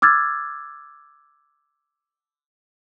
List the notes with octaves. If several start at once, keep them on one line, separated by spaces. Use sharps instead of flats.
D6 E6 F6 G#6 A6